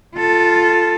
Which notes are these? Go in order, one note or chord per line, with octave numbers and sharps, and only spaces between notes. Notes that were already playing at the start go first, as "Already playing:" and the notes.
F4 A4